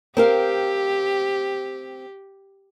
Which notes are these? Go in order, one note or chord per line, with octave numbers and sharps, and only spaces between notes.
C4 G4 A#4 F5